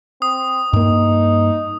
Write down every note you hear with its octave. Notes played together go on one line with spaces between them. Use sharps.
C4 D#6
G2 A#3 D#4